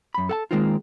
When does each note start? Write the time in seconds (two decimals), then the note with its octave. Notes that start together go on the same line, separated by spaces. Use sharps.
0.14 F#2 B5
0.29 A4 F#5 A5
0.51 D#3 G#3 A#3 C4 D#4 F4